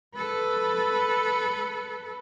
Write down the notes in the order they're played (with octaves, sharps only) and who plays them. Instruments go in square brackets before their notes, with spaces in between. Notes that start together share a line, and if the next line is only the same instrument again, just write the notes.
[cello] A4 B4